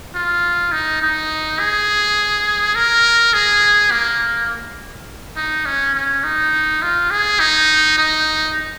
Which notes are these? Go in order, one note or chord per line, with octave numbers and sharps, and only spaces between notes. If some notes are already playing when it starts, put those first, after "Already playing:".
F4
D#4
D#4
G#4
A#4
G#4
A#3
D#4
C#4
C#4
D#4
F4
G#4
D#4
D#4